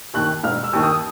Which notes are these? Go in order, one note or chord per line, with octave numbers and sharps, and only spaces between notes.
D#2 D#3 F#6
E1 F6
E6
D#2 D#3
D#6